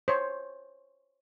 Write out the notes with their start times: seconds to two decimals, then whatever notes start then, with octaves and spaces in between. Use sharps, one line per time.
0.08 C5 C#5